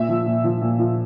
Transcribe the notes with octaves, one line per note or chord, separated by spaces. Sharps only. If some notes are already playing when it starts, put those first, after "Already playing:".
Already playing: A#2 E5
F3
A#2
F3
A#2
F3